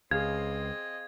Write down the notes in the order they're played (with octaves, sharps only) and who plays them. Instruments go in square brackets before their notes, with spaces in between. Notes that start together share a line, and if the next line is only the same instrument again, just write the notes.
[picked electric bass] C#2 [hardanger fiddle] C4 D#5 [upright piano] G#4 F5 F6 [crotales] G#6